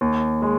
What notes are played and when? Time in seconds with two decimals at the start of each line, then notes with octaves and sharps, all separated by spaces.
0.01 D#2
0.42 G#3